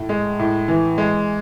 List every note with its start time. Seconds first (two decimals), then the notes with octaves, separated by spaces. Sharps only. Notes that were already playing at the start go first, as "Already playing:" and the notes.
Already playing: A2
0.09 G#3
0.39 A2
0.68 E3
0.98 G#3